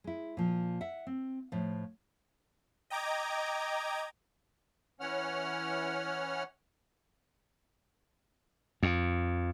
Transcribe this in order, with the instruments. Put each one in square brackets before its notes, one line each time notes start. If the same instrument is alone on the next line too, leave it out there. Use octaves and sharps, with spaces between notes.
[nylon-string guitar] G#3 E4
A#2 F3
E5 F#5
C4
A2 F3
[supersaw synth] D#5 G5 A#5 D6 G#6
[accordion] E3 C#4 C#5 F#5 F6
[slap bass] F2